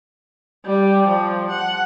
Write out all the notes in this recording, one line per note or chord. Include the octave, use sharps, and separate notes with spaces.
G3
F3
F#5